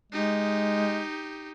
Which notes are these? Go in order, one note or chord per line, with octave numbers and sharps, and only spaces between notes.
G#3 D#4 G4